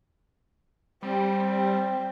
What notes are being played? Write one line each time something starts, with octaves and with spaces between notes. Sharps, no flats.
G3 C4